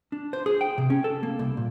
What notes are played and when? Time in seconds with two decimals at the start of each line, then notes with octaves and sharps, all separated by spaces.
0.12 D4
0.33 C5
0.46 G#4
0.61 G5
0.78 C3
0.90 C#4
1.04 A4
1.23 A#3
1.39 C2
1.57 A#2